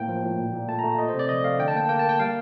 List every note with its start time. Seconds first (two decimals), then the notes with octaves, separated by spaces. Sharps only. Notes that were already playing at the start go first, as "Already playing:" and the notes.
Already playing: A2 A#3 G5
0.08 F3
0.23 A2
0.38 A#2
0.53 A#2
0.68 A3 A5
0.79 A#5
0.84 A3
0.99 A3 D#5
1.09 C5
1.14 C3
1.19 D5
1.29 F3 D#5
1.44 A3 F5
1.59 D3 G5
1.68 A5
1.74 A#3 G5
1.89 A#3 G5
1.99 A#3 A5
2.09 G5
2.20 G3 F5